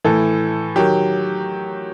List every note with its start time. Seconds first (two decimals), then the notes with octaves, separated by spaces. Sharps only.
0.05 A2 E3 A4
0.76 D#3 F#3 G4